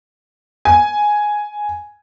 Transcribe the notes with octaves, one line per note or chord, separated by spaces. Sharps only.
G#5